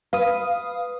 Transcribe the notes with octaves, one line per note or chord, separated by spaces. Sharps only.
B4 F5 D#6